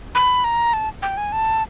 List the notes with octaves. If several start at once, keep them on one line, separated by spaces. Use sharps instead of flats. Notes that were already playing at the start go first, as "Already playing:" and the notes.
B5
A#5
A5
G5
G#5
A5